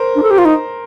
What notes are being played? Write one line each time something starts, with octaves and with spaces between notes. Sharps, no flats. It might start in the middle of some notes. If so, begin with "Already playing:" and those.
Already playing: A#4 C5
D4
A4
G4
F4
D#4